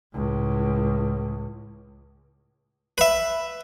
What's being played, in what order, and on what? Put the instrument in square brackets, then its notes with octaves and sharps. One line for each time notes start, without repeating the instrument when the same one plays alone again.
[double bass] C#2 A2
[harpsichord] B4 E5